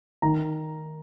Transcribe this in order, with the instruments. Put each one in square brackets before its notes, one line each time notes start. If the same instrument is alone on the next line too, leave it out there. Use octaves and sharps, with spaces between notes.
[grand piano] D#3 A#5